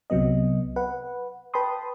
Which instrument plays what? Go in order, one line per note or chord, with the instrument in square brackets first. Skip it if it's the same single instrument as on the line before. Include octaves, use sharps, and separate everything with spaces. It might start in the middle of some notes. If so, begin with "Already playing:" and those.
[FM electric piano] C2 C3 F#3 B3 D#5
B4 F#5
B4 G5 A5 B5 C6 D#6